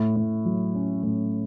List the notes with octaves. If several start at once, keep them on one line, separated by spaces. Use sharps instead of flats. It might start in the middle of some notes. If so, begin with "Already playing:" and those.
Already playing: A2
A2
F#3
C#4
A2